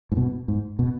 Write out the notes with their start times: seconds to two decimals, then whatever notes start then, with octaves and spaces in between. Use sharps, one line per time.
0.12 G#2
0.17 B2
0.48 G#2
0.79 B2